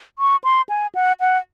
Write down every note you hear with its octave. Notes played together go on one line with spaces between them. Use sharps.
C#6
C6
G#5
F#5
F#5